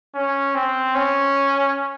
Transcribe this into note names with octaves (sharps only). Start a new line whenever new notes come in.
C#4
C4
C#4